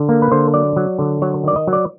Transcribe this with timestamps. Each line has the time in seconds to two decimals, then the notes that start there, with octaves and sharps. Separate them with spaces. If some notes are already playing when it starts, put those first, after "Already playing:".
Already playing: D3
0.09 A#3
0.22 B4
0.31 D3 C5
0.54 F#3 D5
0.76 F#3
0.99 D3
1.22 F#3 C#5
1.44 D#3 D5
1.56 D#5
1.67 F#3
1.73 D5